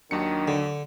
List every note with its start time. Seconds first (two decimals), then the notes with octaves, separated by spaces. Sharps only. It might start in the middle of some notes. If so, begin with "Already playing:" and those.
0.11 D#2 D#3 F#3 D4 C#7
0.48 D3